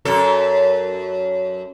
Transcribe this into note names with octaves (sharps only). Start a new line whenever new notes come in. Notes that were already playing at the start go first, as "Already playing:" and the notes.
F#2 A4